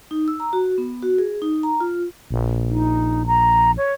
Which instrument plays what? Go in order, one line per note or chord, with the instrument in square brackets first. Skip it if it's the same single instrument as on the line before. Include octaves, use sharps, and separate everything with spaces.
[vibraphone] D#4
E6
A#5
F#4
B3
F#4
G#4
D#4
A#5
F4
[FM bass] A#1
[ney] D#4
A#5
C#5